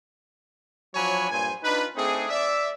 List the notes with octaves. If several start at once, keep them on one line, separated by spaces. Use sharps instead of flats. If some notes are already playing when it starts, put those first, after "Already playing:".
F3 F#3 D4 C#5 G#5 B5
G2 A#2 C5 G#5
D4 D#4 F4 B4
A3 C4 D4 D#4 G#4
D5 E5